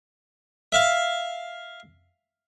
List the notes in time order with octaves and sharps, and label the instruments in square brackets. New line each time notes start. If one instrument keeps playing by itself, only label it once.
[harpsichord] E5 F5